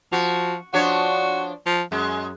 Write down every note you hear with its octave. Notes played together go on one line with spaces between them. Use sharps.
F3 F#4
F3 D4 F#4 C#5
F3
F#2 G#3